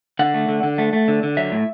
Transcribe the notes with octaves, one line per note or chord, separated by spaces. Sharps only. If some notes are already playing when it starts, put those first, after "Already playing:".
D3 F#5
A3
D3
D3
A3
A3
D3
D3
F#3 E5
A2